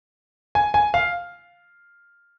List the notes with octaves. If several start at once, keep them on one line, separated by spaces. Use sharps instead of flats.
G#5
G#5
F5